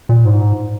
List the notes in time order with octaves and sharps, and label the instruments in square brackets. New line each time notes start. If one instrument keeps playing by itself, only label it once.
[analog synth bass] A#2
G#2